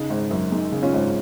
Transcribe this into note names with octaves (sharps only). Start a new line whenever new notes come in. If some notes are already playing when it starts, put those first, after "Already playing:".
Already playing: C#3 D#4
G#1
F#2
G#3 D#4
C#3
C#4 F4
G#1